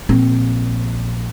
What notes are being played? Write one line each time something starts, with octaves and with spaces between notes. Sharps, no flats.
A#1 C4